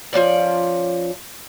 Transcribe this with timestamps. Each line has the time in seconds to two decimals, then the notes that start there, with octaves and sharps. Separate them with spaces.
0.13 F3 B3 C#4 D5